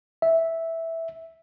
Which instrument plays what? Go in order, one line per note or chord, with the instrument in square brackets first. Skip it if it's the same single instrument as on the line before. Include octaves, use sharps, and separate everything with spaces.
[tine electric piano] E5